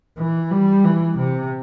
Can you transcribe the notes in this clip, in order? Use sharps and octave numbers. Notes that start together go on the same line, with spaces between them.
E3
G3
E3
C3